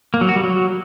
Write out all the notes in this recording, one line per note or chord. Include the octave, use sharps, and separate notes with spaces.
A#3
F#3
F#4
G3
F#3